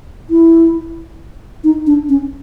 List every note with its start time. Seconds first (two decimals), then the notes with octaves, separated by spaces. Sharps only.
0.30 E4
1.64 D#4
1.87 D4
2.09 C#4